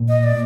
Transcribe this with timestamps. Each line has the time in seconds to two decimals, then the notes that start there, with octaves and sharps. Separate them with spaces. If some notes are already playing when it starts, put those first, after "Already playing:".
Already playing: A#2
0.08 D#5
0.23 D5